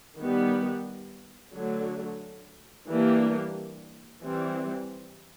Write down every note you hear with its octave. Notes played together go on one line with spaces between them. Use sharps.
D#3 G3 B3
D3 F#3 A3
E3 G3 A#3 D4 G4
E3 G3 C4